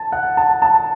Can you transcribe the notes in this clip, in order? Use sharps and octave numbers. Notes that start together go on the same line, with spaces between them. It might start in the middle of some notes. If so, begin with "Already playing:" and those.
Already playing: A5
F#5
A5
A5